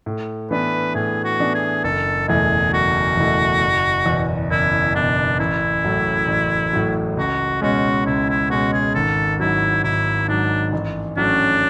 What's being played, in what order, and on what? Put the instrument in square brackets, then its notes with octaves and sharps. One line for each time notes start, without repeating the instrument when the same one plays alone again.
[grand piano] A2
[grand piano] E3 B3 D4 [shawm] B4
[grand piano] A2 [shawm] G#4
[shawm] F#4
[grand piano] E3 B3 D4
[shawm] G#4
[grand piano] F#1 [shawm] A4
[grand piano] E2 B2 A3 E4 [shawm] G#4
[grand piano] F#1 [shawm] F#4
[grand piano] E2 B2 A3 E4
F#1
E2 B2
[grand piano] F#1 [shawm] E4
[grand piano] E2 B2 [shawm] D4
[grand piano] A1 [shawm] E4
[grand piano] A2 F#3
A1
A2 F#3
[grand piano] C#2 [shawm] F#4
[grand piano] B2 G#3 C#4 [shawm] F#4
[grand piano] C#2 [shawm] E4
[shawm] E4
[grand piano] B2 G#3 C#4 [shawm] F#4
[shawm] G#4
[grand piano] G#1 [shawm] A4
[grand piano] G#2 F#3 [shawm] E4
[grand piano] G#1 [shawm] E4
[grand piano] G#2 F#3 [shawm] D4
[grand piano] A1
[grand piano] A2 F#3 C#4 [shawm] D4